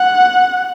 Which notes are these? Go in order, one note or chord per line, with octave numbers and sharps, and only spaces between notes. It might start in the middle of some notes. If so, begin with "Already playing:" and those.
Already playing: F#5